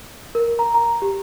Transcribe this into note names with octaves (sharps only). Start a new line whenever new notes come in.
A#4
A#5
A#5
G4